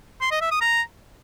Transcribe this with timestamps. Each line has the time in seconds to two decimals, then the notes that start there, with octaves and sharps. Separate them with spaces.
0.21 C6
0.31 D#5
0.41 E5
0.51 D#6
0.61 A#5